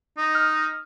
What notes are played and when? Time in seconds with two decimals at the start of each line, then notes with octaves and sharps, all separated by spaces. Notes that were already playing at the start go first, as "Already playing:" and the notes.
0.18 D#4 D#5
0.35 F6